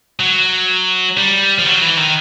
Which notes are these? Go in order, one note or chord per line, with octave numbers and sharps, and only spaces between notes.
F#3
G3
F3
F#3
E3
D#3